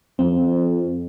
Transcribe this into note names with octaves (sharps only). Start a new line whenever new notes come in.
F2 C4